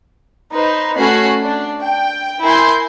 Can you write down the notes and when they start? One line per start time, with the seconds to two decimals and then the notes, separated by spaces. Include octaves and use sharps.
0.53 D#4 B4 C5
0.97 A3 C#4 F#4 B5 F#6 C7
1.42 D4
1.82 G5
2.43 E4 A#4 G#5 C6 G6